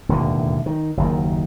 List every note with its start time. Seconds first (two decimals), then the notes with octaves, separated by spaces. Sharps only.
0.09 E1 D#2 A2 D3
0.66 D#3
0.97 F#1 D#2 D#3